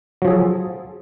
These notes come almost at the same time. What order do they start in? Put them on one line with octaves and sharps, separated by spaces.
F#3 F3 G#4 A4